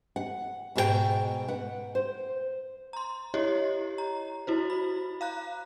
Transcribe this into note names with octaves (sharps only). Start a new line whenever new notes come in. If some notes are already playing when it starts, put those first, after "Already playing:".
F#5
G#2 B2 G#4 A4 G5
B4 F#5
C5
A#5 C6
E4 G4 C#5 D#5
A#5
E4 F#4 C5
B5
F5 A#5 F#6